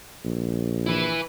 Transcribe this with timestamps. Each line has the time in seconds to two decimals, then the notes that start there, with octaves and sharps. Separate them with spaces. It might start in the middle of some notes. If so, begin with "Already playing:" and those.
0.24 A#1
0.86 E4 B4